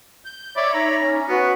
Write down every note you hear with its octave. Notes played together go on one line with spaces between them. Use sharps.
G6
C#5 D5 E5 B5
D#4 A#5
C#4
B3 F#4 B4